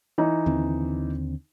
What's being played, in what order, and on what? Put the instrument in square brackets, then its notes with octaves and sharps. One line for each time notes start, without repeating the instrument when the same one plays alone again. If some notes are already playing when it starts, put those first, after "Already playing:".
[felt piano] E3 D#4
[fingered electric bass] D#2 D3 C4